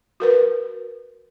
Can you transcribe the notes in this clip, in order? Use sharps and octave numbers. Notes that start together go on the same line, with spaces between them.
F#4 A#4 B4